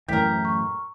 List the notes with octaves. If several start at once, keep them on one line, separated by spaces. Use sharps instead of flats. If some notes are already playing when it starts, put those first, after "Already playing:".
F#2 A2 E3 G4 A#4 G6 B6
C#6